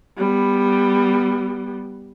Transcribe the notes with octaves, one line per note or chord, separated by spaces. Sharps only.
G3 B3